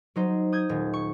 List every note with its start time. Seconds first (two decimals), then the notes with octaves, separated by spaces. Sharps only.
0.16 F#3 D#4 C5
0.52 D#6 G6 G#6
0.69 D#1
0.94 C#6